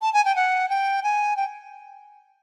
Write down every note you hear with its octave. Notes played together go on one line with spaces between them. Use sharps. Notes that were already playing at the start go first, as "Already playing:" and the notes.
A5
G#5
G5
F#5
G5
G#5
G5